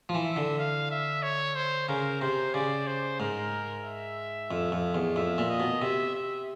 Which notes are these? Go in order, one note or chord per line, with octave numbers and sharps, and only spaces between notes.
F3
E3
E5
D3
F5
E5
C#5
C5
C#3 A#4
C3 C5
C#3 D5
C5
G#2 A#4
E5
F2
F2
E2
F2 E5
A#2
D#5
B2
C3 E5
E5